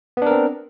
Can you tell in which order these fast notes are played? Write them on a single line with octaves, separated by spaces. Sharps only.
B3 D4 A#4 C4